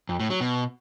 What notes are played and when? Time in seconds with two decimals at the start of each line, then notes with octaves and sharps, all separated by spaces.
0.09 F2
0.20 A2
0.30 F#3
0.41 B2